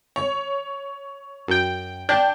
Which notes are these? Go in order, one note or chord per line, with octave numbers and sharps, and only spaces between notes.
C#5
F#2 G5
D4 G5 G6